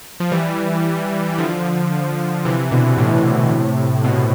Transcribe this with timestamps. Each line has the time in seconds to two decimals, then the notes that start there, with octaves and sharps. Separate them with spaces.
0.20 F3
0.31 E3 G3
1.38 D3 F3
2.45 C3 E3
2.71 B2 D3
2.97 A2 C3
4.04 B2
4.14 A2